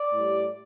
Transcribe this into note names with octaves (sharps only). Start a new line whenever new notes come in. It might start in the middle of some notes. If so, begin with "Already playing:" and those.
Already playing: D5
A2 G3